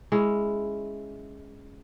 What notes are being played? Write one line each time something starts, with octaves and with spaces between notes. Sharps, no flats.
G#3 C#4 E4